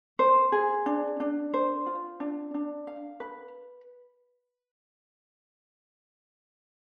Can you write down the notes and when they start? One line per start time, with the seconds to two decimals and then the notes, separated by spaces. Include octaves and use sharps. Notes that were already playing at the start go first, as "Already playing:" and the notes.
0.19 C5
0.52 G#4
0.86 D4
1.20 D4
1.54 C5
1.86 F4
2.20 D4
2.54 D4
2.87 F5
3.20 B4